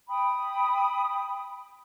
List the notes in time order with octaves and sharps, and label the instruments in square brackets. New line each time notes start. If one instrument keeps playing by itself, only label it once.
[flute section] G5 B5 D#6